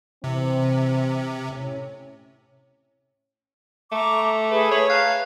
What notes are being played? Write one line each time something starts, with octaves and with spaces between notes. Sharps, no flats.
C3 E3 C4
A2 C#4
A3 A#5 C#6 D6
G#4 B4 B5
C#5
F5 A5 A#5 F#6